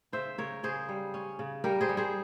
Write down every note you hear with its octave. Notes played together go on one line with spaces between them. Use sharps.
C#3 C5 E5
C#3 A#4 C#5
C#3 G#4 C5
G3
C#4
C#3
G3 G4 A#4
G#4 C5
G3
G#4 C5